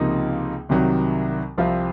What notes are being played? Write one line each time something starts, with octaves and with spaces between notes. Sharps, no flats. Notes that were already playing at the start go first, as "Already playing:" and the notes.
Already playing: C#2 C3 F3 A#3 D#4
C2 C3 D#3 F#3
C2 C3 F3 C4 F4